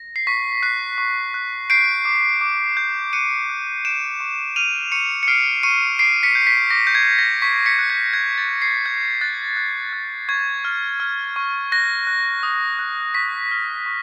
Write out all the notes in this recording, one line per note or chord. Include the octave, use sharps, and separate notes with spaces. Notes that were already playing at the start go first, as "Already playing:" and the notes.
Already playing: A#6
C7
C#6 B6
F#6 C7
C#6
F#6
G6 C7 D7
D6
D6
G6
F#6 C#7 D#7
F#6
F#6 D7 E7
C#6
F6 D#7 F7
C#6 C#7 D#7
C#7
F6 C7 D7
C#6 C#7 D#7
D6 C7 D7
B6 C#7
G6
B6
D6 A#6
G6
G#6
G6
A#6
C#6 B6
B6 C#7
F#6
G#6
F#6 G#6
A6
F#6
C7
F#6 G#6
F#6 A6
F#6
F#6
C#6 G#6
F6
F6
C#6
F#6 A#6
F#6
D#6
F#6
C#6 B6
F6
C#6